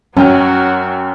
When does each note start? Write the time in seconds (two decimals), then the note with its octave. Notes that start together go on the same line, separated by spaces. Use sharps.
0.17 F#2 F#3 C#4 F#4 G5 F6